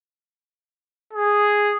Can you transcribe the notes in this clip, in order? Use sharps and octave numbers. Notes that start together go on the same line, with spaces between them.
G#4